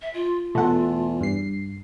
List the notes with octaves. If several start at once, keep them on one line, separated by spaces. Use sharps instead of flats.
E5
F4
E2 B2 A3 A4 F#5
G2 C7